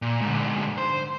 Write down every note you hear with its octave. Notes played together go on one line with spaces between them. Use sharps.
A#2
G#2 D3
C5